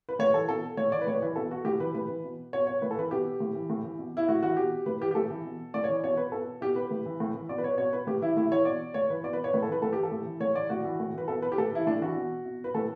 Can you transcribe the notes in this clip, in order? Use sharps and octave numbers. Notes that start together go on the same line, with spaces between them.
B4
A2 C#5
E3 A4
B2 A4
A2 C#5
E3 D5
B4
A2 C#5
E3 B4
B2 A4
F#4
A2 G4
E3 B4
A2 B4
E3
B2
B2 C#5
C#5
A2 B4
A4
E3 B4
B2 G4
A2
E3
A2
E3
B2
E4
A2 F#4
E3 F#4
B2 G4
A2 B4
E3 G4
G4
A2 A4
E3
B2
A2 D5
C#5
E3
B2 C#5
B4
B2 A4
B2 G4
B4
A2
E3
A2
E3
B2 D5
B4
C#5
B2 C#5
B4
A2 G4
E3 E4
A2 E4
E3 C#5
B2 D5
A2 C#5
E3 B4
B2 D5
B4
C#5
A2 B4
A4
E3 B4
A2 A4
E3 G4
A4
A2
E3
A2 C#5
E3 D5
A2 F#4
E3
A2
E3 B4
B2 A4
B4
G4
A2 A4
E3 E4
A2 D4
E3 F#4
B2
B2
B4
A2 A4